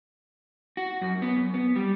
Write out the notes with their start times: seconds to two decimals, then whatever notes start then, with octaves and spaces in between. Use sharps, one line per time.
0.77 F#4
1.01 F#2
1.22 B3
1.36 F#2
1.54 B3
1.76 G3